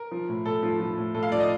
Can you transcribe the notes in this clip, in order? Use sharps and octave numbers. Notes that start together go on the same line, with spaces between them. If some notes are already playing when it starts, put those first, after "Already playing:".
Already playing: A#4
F3
A2
A2 A4
F3
F3
A2
A2 A4
F5
F3 D5
D#5